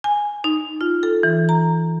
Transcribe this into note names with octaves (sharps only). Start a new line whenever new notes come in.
G#5
D#4
F4
A4
E3
A#5